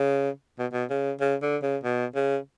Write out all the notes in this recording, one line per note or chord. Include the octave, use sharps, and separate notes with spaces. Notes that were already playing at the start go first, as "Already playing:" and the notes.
Already playing: C#3
B2
B2
C#3
C#3
D3
C#3
B2
C#3